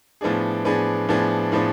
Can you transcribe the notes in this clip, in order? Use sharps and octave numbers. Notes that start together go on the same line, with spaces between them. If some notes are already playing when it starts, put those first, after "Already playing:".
A2 F3 B3 D4 G#4
A2 F3 B3 D4 G#4
A2 F3 B3 D4 G#4
A2 F3 B3 D4 G#4